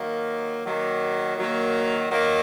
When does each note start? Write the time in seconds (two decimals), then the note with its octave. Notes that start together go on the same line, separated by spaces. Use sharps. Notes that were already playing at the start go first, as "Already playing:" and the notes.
Already playing: D#3 F#3 A#3
0.65 D#3 F#3 A#3
1.37 D#3 F#3 A#3
2.10 D#3 F#3 A#3